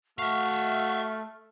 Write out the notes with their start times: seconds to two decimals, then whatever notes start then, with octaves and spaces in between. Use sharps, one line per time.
0.19 A3 F#4 E5 F5 F6